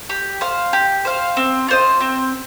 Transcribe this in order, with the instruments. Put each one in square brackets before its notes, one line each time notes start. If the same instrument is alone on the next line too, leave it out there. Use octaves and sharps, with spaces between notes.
[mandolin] G4
C5 F5
G4
C5 F5
C4
F4 C5 D#5
C4